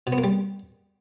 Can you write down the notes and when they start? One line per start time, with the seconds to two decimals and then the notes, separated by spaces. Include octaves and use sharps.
0.07 B2
0.12 B3
0.18 A#3
0.24 G3